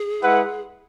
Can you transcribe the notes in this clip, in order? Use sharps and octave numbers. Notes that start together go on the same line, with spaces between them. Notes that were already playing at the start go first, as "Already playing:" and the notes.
Already playing: G#4
G#3 E4 B4 F#5